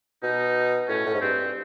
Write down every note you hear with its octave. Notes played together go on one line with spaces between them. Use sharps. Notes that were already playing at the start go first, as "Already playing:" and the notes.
B2 D#4
A2 C#4
A2
G#2
G2 C4